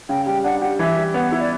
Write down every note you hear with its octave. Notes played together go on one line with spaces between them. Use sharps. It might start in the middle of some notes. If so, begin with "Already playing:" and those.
C#3 G5
G3 G5
D4 F#5
G4 F#5
E3 E5
G3
B3 F#5
E4
D5